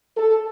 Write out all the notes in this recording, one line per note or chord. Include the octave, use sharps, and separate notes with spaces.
A4